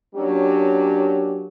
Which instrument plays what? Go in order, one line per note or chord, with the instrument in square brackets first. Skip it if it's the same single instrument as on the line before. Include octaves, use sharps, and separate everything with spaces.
[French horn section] F#3 A#3 C#4 D4 G4